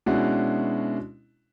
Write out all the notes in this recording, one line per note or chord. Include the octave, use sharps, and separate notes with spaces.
B2 G#3 C#4 D4 E4 F#4